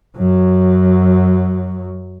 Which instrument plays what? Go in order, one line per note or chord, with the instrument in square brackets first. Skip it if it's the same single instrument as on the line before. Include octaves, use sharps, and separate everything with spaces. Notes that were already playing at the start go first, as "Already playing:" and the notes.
[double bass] F#2 F#3